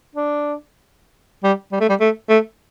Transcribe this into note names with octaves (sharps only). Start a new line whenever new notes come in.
D4
G3
G3
A3
G3
A3
A3